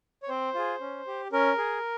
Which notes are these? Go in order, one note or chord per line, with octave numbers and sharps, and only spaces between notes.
C#5
C4 C5
F4 G#4
C#4
G4
C#4 A#4
G#4